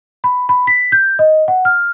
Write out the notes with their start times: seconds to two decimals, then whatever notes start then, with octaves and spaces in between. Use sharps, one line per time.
0.24 B5
0.49 B5
0.67 B6
0.92 G6
1.19 D#5
1.48 F#5
1.65 F6